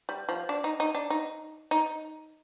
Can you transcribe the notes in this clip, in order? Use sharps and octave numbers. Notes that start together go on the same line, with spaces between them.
G3
F3
D4
D#4
D#4
D4
D#4
D#4